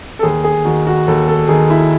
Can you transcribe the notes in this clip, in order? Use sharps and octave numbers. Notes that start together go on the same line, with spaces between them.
A4
D#2 G#4
G#4
D#3 F#4
F#4
D#2 A4
A4
D#3 G#4
E4